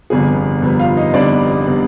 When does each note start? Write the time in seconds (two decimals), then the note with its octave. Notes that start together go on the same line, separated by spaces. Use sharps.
0.10 G1 F2 C3 G3 B3 G#4
0.62 G1 F2 C3 G3 B3
0.79 F4 F5
0.97 D#4 D#5
1.14 G1 F2 C3 G3 B3 D4 D5
1.66 C3 G3 B3